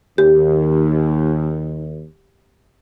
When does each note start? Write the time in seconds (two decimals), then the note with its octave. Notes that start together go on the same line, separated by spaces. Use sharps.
0.18 D#2 G4